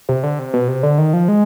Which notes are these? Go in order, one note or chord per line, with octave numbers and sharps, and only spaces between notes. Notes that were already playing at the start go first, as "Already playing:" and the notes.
C3
D3
C3
B2
C3
D3
D#3
F3
G#3